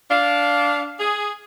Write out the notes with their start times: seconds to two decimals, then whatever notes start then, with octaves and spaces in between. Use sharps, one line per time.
0.10 D4 F5
0.99 G#4